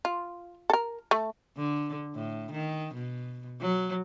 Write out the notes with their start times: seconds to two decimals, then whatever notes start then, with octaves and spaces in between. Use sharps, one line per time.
0.05 F4
0.70 A4 A#4
1.11 A3
1.57 D3
2.15 A2
2.52 D#3
2.94 B2
3.61 F#3